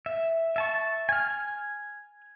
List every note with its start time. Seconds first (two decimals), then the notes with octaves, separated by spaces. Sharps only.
0.06 E5
0.56 E5 A5 C#6
1.09 G#5 F6